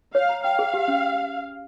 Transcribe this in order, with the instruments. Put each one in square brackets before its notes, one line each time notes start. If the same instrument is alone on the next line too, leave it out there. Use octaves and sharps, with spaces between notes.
[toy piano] C#5 [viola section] F5
[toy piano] A#5
[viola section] F5 [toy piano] G5
[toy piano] G#4
G4
C#4